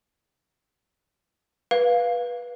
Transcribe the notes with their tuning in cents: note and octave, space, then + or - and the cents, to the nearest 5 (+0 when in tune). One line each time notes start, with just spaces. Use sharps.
B4 -15 F5 +0